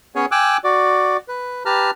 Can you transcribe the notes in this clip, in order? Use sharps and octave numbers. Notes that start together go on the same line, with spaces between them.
B3 C#4 G#4 C#5 G#5
G5 G#5 D6 E6 F#6
F#4 D5
B4
G4 B4 A5 A#5 F6